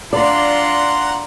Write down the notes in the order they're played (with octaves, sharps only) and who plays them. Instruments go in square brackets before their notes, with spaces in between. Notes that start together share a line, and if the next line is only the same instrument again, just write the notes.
[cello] D4 F4 [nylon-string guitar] D5 [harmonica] F#5 A#5 C6